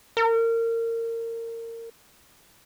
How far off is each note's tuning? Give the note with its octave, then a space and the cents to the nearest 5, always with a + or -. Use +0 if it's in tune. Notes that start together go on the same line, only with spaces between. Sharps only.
A#4 -25